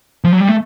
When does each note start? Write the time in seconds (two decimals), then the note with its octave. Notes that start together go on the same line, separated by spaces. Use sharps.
0.24 F3
0.32 F#3
0.41 G3
0.49 A3